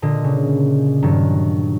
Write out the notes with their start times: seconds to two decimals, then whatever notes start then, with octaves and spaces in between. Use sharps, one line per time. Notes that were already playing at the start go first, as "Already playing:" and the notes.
0.02 A#2 D3 D#5
0.24 C#3
1.03 G2 D#3 F#3